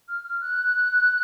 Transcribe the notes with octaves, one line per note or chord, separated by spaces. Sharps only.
F6
F6
F#6